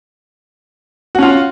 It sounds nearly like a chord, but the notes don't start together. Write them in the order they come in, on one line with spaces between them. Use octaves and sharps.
F#4 C#4 F4